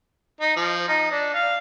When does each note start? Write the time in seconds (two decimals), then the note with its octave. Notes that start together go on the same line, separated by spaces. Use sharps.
0.41 D#4
0.57 F3
0.89 D#4
1.11 D4
1.34 F5